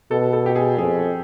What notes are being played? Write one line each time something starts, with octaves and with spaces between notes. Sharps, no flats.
B2 A4
A4
G4
G#4
F2 G#4